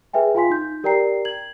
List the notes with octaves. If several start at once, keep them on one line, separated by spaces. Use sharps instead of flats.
G#4 B4 E5 G5 G#5
F4 F5 G#5 C6 B6
D#4 G6
G4 A#4 D5 G5 A#5 C7
G#6 F#7